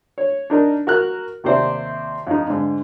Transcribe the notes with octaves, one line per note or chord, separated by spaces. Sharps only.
C#5
D4 D#4 A#4
F#4 A#4 F6 F#6
D#2 C3 G4 C5 D5 E5
F2 D#4
G#2 D3